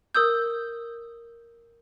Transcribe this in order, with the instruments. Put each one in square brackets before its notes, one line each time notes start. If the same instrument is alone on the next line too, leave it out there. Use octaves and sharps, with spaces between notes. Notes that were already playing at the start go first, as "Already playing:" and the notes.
[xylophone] A#4 D#6 E6 G6